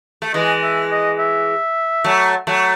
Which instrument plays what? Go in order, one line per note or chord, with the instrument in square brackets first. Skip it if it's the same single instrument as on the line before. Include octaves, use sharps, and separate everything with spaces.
[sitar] A3
[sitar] E3 G#3 [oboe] D#5
[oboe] E5
D#5
E5
[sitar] F#3 A3
F#3 A3